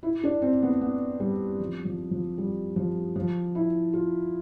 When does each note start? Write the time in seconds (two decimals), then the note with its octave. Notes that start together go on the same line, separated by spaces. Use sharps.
0.03 E4
0.23 D4
0.42 C4
0.62 B3
0.81 B3
1.20 G3
1.60 F3
1.85 F3
2.11 F3
2.38 G3
2.76 F3
3.16 F3
3.55 E4
3.93 F4